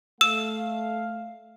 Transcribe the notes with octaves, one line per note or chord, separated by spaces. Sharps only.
A3 F5 E6 E7